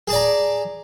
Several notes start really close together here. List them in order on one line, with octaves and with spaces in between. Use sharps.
G#4 A5 D5 A#5